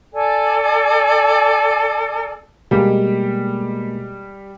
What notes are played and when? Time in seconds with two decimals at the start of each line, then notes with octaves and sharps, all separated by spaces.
0.13 A4 D5 G#5
2.71 B2 G3 G#3 A#3 G4